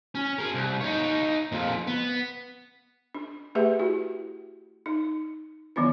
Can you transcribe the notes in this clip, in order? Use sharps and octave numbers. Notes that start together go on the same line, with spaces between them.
C#4
G#4 A#4
C2
D#4 C#5
F2 A#2
B3
D4
A3 G4 G#4 B4 E5
E4 F#4
D#4
D#3 E3 F#3 B3 D4 E4